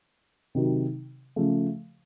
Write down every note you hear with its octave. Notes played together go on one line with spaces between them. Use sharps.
C3 D#3 F#3
C#3 F3 A3